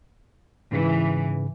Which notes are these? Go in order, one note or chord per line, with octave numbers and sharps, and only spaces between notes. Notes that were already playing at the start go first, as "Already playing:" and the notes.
G#2 C#3 E3 B4